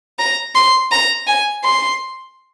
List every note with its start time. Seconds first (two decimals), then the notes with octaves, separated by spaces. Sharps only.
0.19 A#5
0.55 C6
0.92 A#5
1.27 G#5
1.64 C6